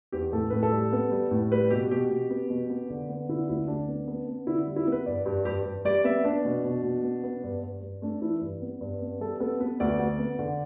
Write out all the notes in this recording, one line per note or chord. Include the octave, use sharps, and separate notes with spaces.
E2 G4
A2 A4
A2 B4
A4
G3
B3
G3
A2
G3 B4
B2 G4
B2 G4
B2
B3
B2
B3
D3
B3
D3 E4
D2 E4
D2 D4
B3
B3
B3
D3 E4
G3
E4
B3
B4
G2 D5
G2 G4
G2 G4
G2
G3 D5
B3 E5
B3 D4
B2
B2
B2
B3
B3
G2
G2
G2
A3 D4
E3 E4
G2
B3
G2
B3
G3 A4
B3 A4
B3 B4
D2 D5
D2
B3
D3